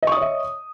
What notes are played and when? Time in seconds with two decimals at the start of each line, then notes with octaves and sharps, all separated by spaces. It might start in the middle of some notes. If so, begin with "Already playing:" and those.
0.03 D#5
0.07 C#6
0.12 D#6
0.17 C#5
0.21 E5